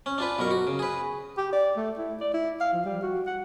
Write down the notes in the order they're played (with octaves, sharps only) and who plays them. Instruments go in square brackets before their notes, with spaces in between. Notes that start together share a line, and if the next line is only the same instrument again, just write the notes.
[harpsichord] C#4
D4 F4 B4
B1 B2 A#4 C#6
F#4
C#3
G#4 B4
[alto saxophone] G4
D5
A3
E4
D5
E4
F5
F3
G3
F#4
F#5